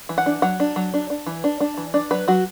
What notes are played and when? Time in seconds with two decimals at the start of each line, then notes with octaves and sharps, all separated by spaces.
0.09 E3
0.18 F#5
0.26 D4
0.42 F#3 F#5
0.60 D4
0.76 F#3
0.94 D4
1.10 D4
1.26 E3
1.44 D4
1.60 D4
1.77 E3
1.94 D4 D5
2.11 F#3 B4
2.28 F#3 F#4